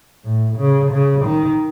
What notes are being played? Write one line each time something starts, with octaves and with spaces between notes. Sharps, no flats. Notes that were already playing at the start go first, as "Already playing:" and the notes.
A2
C#3
C#3
D#3